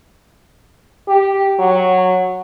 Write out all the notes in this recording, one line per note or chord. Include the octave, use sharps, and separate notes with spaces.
G4
F#3